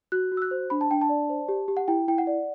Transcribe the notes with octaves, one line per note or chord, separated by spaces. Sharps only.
F#4 F#6
F#4
E6
F#6
C5
D4 B5
A5
D4 G5
A5
D5
C5
G4
G4
F#5
E4 G5
E4 G5
F#5
D5